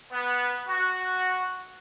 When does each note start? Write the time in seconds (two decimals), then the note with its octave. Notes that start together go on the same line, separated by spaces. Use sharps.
0.11 B3
0.68 F#4